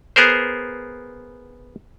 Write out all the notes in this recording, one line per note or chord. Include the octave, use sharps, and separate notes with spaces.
B3 G#4 A#4 C5